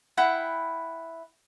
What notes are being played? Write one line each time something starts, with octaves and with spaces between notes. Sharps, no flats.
E4 F#5 G5 B5